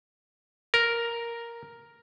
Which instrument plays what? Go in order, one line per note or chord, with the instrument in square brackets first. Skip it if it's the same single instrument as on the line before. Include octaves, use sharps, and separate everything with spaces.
[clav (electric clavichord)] A#4